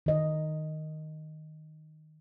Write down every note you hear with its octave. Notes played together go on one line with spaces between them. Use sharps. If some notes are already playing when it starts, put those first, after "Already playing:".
D#3 D#5